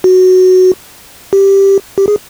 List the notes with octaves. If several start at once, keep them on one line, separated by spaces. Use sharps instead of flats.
F#4
G4
G4
G#4